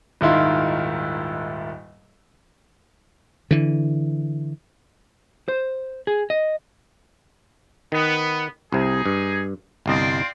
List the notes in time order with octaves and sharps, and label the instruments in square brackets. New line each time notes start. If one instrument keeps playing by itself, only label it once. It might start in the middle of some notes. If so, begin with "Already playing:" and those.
[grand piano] D#1 G#2 D#3 E4 F4 C6
[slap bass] D3 E3
[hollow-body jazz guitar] C5
G#4
D#5
[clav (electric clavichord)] D#3 [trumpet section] B3
[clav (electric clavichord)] C2 C3 [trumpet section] D#4 G#4
[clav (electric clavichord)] G2
[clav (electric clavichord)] G1 C2 D#5 [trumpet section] C4 F4 D5